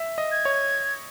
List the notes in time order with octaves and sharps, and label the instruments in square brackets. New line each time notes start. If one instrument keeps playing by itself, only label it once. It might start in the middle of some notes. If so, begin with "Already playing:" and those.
Already playing: [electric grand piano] E5
D#5
[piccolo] G#6
[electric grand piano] C#5